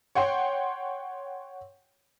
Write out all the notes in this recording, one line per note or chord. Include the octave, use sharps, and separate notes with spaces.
C#5 F#5 G5 C6